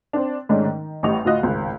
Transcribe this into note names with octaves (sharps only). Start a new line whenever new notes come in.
C4 D4
G#2 D#3 G#3 A3 C#4 D4
D#3
A1 A2 G3 D#5 C#6 F7
D2 A2 F4 F#4 D#5 F#6
G#1 C#2 A2